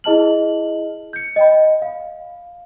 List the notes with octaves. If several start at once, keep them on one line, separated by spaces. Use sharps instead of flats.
E4 G#4 D#5 A5 F6 F#7
G6 C#7
D#5 G5 B5
F5